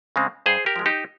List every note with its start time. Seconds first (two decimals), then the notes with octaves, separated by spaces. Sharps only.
0.16 C#3 G#3 C4
0.46 G2 G#4 C5
0.66 G4 A#4
0.76 F3 G#3
0.86 D#4 G4